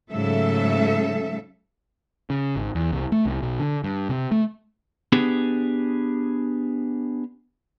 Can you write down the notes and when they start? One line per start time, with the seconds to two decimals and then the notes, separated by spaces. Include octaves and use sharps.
0.11 G#2 C#3 F#3 A3 A4 E5
2.30 C#3
2.56 G#1
2.75 E2
2.92 C2
3.12 A3
3.25 C2
3.42 B1
3.59 D3
3.84 G2
4.09 C3
4.32 A3
5.12 B3 D4 G4 G#4